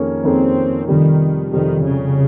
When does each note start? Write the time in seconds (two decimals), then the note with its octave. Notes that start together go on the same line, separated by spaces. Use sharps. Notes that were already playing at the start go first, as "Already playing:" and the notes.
Already playing: F2 D#3 A#3 C#4 G#4
0.24 F2 D#3 A#3 C4 C#4 G#4
0.88 F2 C3 D#3 G3
1.53 F2 C3 D#3 G3
1.86 C#3